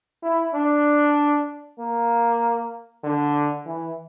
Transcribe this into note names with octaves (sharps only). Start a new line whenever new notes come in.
E4
D4
A#3
D3
E3